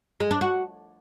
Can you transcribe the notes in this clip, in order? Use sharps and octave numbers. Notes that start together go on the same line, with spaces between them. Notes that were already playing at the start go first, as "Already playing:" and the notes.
G#3
D4
F#4